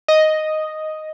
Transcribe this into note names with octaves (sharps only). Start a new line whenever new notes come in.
D#5